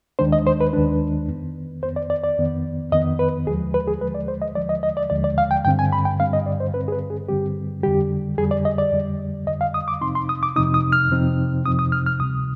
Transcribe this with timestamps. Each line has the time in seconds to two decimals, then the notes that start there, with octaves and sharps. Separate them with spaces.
0.19 D#2 D#3 G#3 D4 C5
0.32 D#5
0.47 C5
0.61 B4
0.73 D#2 D#3 G#3 D4 B4
1.28 F2 D#3 B3
1.83 F2 D#3 B3 C5
1.96 D5
2.10 D5
2.24 D5
2.38 F2 D#3 B3
2.92 F2 D#3 B3 D#5
3.19 B4
3.47 D#2 D3 F3 G#3 G#4
3.74 B4
3.87 G#4
4.01 D#2 D3 F3 G#3 B4
4.15 D5
4.28 C5
4.42 D#5
4.55 D#2 D3 F3 G#3 D5
4.69 D#5
4.83 D#5
4.97 D5
5.10 D#2 D3 F3 G#3 D5
5.24 D5
5.38 F5
5.51 G5
5.65 G2 D3 G3 C4 G5
5.79 G#5
5.93 B5
6.05 G5
6.19 G2 D3 G3 C4 F5
6.33 D#5
6.46 D5
6.60 C5
6.73 G2 D3 G3 C4 B4
6.88 G#4
6.92 B4
7.10 G#4
7.28 G2 D3 G3 C4 G4
7.83 F2 D3 G3 G4
8.38 F2 D3 G3 G#4
8.51 D5
8.65 D#5
8.78 D5
8.92 F2 D3 G3
9.47 F2 D3 G3 D#5
9.61 F5
9.74 D#6
9.88 D6
10.01 F2 C3 F3 C4 D#4 C6
10.15 C6
10.29 D#6
10.43 D6
10.56 F2 C3 F3 C4 D#4 D#6
10.74 D#6
10.92 F6
11.10 F2 C3 F3 C4 D#4
11.66 F2 C3 F3 C4 D#4 D#6
11.79 D#6
11.92 F6
12.06 F6
12.20 D2 C3 G3 D#6